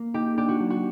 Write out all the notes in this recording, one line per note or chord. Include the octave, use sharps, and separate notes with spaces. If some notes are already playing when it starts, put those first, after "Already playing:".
Already playing: A#3
D#4 G4
D4 G4
F#4
F#3
F#4